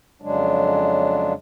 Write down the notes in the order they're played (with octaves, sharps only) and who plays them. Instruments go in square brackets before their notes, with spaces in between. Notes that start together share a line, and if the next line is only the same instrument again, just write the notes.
[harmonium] F2 C#3 F#3 G#3 D4